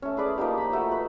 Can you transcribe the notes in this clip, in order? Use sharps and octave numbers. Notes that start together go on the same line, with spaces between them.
A3 C#4
G#4 B4 D5
F3 A#3 D#4 G4
B5
A3 F#4
B4